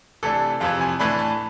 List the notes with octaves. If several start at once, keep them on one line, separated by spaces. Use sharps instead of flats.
C3 E3 A3 D4 A4
F2 C3 E3 F5
G#5
A2 E3 A3 D4 B5
A5